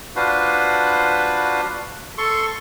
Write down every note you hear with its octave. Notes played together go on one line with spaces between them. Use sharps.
D4 F4 F#4 B4 C5
A4 C6 C#6